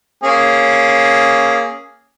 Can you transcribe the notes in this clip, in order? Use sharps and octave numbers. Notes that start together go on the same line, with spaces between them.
A#3 C#4 G#4